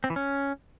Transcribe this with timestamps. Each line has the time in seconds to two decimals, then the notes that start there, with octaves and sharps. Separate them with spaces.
0.04 C4
0.10 E3
0.16 C#4